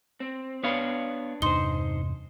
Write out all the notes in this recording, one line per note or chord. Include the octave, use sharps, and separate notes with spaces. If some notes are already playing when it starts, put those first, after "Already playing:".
C4
B3 D4 B4 C#5 F5
E2 G2 C3 D#4 C5 C6 G7